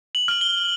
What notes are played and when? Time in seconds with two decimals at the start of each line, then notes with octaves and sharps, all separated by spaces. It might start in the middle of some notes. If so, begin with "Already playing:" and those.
0.15 F#7
0.28 F6 F#7
0.41 G7